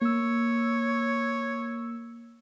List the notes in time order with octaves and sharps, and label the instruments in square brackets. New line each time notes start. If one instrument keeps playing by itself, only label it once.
[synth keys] A#3 E6 [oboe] C#5